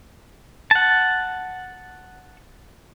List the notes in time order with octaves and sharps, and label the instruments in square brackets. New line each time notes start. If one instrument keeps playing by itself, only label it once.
[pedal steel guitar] F#5 A5